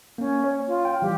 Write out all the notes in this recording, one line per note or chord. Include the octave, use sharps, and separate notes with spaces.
A#3 C#4
C#5
F4
G5
E3 G3 G4